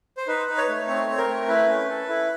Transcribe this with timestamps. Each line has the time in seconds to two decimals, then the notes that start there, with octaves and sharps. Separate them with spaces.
0.17 C5
0.27 D#4 B4
0.48 D#4
0.57 C#5
0.68 A3
0.87 C4 C#5
1.07 C4
1.18 A#4
1.28 A3
1.47 E4 B4
1.68 C#4
1.88 A4
2.09 E4